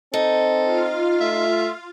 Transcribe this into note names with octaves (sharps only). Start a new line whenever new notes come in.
C4 D#4 A4
F4 F5
A3 E5